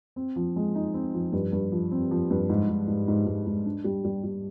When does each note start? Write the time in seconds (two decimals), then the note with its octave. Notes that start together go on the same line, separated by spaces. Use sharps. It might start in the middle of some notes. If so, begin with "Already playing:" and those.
0.16 C4
0.36 F3
0.56 G#3
0.75 D#4
0.94 C4
1.14 F3
1.32 G2
1.52 G2
1.72 F3
1.91 C4
2.11 F3
2.31 G2
2.49 G#2
2.69 G#2
2.88 G#2
3.08 G#2
3.27 G#2
3.47 G#2
3.66 D4
3.84 G3
4.05 G3
4.24 G3